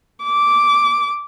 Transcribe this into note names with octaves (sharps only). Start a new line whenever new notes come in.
D6